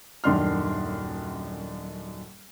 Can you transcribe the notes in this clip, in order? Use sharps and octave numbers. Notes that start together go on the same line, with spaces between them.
D#1 F#2 D#3 D4 C6 F6